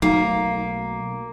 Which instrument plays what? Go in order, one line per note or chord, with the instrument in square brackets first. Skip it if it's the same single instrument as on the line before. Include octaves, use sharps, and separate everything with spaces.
[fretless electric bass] B1 F#3 A3 [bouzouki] A#3 [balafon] D#4